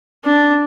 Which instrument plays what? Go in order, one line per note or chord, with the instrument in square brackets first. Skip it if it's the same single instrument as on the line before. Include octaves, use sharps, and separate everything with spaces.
[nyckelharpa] D4